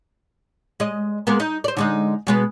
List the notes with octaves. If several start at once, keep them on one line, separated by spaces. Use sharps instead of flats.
G#3 D#5
G#3 A#3 B3
D#4
C5 D5
D3 G#3 D#4
B2 G#3 B3